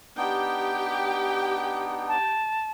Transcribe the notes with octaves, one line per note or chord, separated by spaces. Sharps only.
B3 D4 D#4 G4 G5
A5